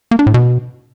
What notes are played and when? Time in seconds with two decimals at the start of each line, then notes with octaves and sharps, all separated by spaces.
0.11 A#3
0.19 D4
0.27 A2
0.34 B2